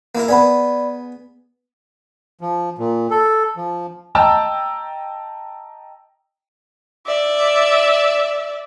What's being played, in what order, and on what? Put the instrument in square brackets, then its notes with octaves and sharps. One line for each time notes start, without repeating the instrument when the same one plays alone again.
[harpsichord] A#3 E4 A#4
[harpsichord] B3 G#4 [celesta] D5 B5
[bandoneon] F3
A#2
A4
F3
[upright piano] D#5 G5 A5 A#5 E6
[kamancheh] D5 E5